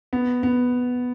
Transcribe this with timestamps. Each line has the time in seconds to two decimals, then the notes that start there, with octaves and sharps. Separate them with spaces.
0.13 B3
0.43 B3